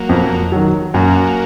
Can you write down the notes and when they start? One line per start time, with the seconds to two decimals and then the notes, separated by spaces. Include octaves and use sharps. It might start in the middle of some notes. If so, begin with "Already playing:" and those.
Already playing: F#3 A#3
0.09 F2
0.52 D#3 F#3
0.94 F#2 F#3 A#3